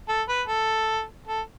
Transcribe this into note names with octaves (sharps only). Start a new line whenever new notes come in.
A4
B4
A4
A4